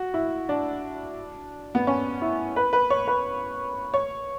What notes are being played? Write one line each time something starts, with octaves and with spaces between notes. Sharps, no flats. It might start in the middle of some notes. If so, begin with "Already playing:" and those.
Already playing: F#4
E4
D4
B3
C#4
E4
B4
B4
C#5
B4
C#5